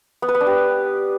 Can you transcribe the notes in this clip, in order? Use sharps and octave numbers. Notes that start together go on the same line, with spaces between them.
B3
B4
B3
D4
G4